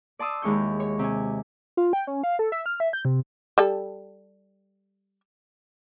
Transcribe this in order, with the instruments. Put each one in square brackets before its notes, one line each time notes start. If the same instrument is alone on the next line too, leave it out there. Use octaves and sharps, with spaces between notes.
[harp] D5 A5 C6 D#6 E6
D#2 G#3 E4 C#6 G6
C#5 C#6
C3 G#5
[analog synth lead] F4
G5
C#4
F5
A4
E5
F6
E5
G6
C3
[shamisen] G3 A4